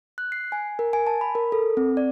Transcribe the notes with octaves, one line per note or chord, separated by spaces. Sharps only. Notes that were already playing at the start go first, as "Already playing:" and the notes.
F#6
C7
G#5
A#4
G#5
A5
B5
A#4
A4
C4
D5